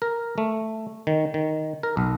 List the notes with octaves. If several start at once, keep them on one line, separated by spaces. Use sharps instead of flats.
A#4
A3
D#3
D#3
A#4
B1